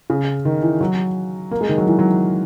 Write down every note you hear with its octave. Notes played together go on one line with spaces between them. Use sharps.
C#3
D#3
E3
F#3
A#3
G#3
D#3
F#3
E3
F#3